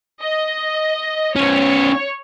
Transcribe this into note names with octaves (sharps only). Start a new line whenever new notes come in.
D#5
B3 C#4 C#5